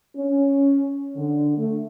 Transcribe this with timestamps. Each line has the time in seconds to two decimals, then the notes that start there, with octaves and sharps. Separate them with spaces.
0.16 C#4
1.16 D3
1.56 A3